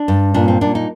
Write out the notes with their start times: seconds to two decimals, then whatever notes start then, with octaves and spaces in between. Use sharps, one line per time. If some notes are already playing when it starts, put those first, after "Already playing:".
Already playing: D4
0.08 G2
0.34 A#2 D4
0.48 C4
0.61 A#2 D4
0.75 D#4